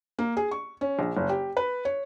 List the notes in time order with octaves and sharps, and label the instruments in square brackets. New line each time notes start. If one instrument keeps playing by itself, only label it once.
[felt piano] A#3
G#4
C#6
C#4
A#1
F#1
G4
B4
C#5